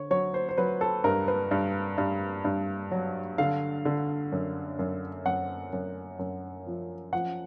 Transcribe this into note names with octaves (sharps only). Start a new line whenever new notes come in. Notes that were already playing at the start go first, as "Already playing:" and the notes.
Already playing: D3 C#5
F#3 C#5
C5
C5
F#3 B4
A4
G2 A#4
B4
G2
G2
G2
F#3
D3 F5
D3
F#2
F#2
F#2 F#5
F#2
F#2
F3
F3 F#5